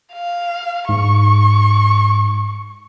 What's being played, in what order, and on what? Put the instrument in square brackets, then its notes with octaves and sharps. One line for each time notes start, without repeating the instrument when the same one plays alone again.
[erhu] F5
[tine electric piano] G#2 [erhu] C#6